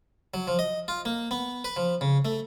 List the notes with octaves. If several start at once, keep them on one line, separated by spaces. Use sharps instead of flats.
F#3
F3
D#5
F4
A#3
B3
B4
F3
C#3
A3